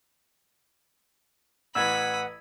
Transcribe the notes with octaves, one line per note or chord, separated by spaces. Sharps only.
A1 E3 F#5 B5 D#6 E6 G#6